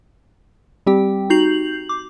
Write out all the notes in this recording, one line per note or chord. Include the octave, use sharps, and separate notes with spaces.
G3 C4 G4 G5
D#4 F#4 G6 C7 F7 F#7
D6